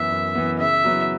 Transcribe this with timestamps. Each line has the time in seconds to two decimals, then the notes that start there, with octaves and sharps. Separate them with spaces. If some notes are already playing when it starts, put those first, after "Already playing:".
Already playing: F#2 E3 B3 E5
0.11 F#2
0.35 E3 B3
0.59 C#3 E5
0.84 F#3 B3 E4